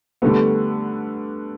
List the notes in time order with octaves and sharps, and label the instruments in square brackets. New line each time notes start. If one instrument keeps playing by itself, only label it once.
[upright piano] D3 G3 B3 [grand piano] A3